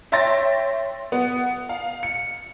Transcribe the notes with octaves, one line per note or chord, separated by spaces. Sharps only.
C#5 E5 G5 C6 A6 A#6
B3
F5
C#7